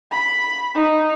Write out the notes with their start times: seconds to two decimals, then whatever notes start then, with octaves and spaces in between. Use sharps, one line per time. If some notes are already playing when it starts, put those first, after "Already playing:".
0.11 B5
0.75 D#4